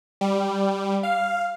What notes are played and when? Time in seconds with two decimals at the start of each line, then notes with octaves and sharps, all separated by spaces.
0.21 G3
1.03 F5